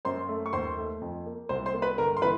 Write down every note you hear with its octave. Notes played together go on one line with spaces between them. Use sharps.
F#2 C5 C6
A3
C#6
D#2 C5 C6
A3
F2
A#3
C2 C5 C6
C5 C6
A#3
B4 B5
G1 A#4 A#5
C6
E3 B4 B5